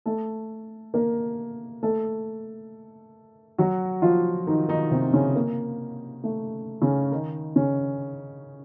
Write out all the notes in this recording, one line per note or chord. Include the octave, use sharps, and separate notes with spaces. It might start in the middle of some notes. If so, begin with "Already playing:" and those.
A3 A4
A#3 A#4
A3 A4
F#3 F#4
F3 F4
D#3 D#4
D#3 D#4
C3 C4
C#3 C#4
A#3
A3
C#3 C#4
D#3 D#4
C#3 C#4